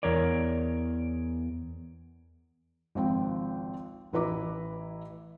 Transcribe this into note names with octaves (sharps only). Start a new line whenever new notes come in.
E2 A#4 C#5 D5
G#1 C#2 F3 C4 G5
A1 E3 E4 B4 A#5 D6